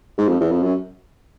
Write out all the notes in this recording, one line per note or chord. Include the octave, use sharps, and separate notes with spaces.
G#2
F2
E2
F2
F#2